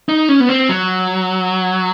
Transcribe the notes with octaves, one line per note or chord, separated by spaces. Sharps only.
D#4
C#4
B3
C4
F#3